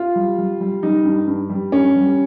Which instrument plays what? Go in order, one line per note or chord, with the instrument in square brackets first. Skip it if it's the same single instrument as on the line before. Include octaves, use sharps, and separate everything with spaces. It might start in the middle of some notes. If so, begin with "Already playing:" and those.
Already playing: [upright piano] F4
G3
G3
G3
G3 D#4
G2
G2
G3
G2 C#4
G3